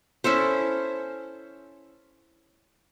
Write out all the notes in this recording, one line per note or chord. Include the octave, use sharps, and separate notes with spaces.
C#4 E4 A4 C5